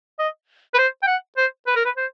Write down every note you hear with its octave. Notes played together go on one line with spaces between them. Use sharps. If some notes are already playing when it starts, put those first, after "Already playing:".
D#5
B4
C5
G5
F#5
C5
B4
A#4
B4
C5